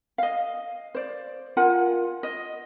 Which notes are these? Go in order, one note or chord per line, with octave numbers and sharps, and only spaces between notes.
D#5 F5
C5 D5
F4 A#4 F#5 G#5
D#5